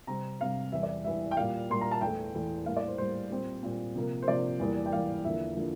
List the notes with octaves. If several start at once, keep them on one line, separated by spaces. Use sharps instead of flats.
C3 G3 C4 A#5
C3 G3 C4 F5
E2 E3 G3 E5
D5
E2 E3 G3 E5
G5
A#2 G3 A#3 F5
A#2 G3 A#3 C6
A#5
A5
E2 E3 A3 G5
E2 E3 A3
A2 G3 A#3 F5
D5
C5
A2 G3 A#3 C5
A#2 G3 C4 C5
A#2 G3 C4
C3 F3 A#3
C5
C3 F3 A#3 D5
E2 E3 G3 A#3
G5
E2 E3 G3 A#3 F5
E2 D3 F3 A#3 E5
D3 F3 A#3